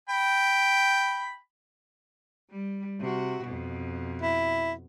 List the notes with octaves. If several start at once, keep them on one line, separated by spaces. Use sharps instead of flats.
G5 B5
G3
C3 F#4
F2 B2
E4